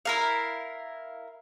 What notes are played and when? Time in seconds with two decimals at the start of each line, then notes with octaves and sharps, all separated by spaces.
0.05 E4 A#4 F5